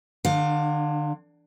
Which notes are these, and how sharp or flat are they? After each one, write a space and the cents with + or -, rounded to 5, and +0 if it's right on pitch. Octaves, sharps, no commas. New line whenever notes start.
D3 +40 D4 +0 F5 +20